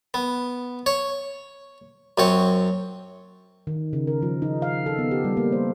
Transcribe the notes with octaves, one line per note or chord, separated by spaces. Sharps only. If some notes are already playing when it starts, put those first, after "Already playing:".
B3
C#5
F#2 C4 C#5
D#3
C#3
A#4
F3
D#4
F5
A4
B3
G4
G3
A#3
C5